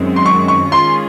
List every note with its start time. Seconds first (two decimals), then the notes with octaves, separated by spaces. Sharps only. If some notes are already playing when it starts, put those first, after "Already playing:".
Already playing: F#2 D#3 G#3 C4
0.16 C6
0.26 C#6
0.48 C#6
0.71 D#3 G#3 C#4 F4 G#4 C6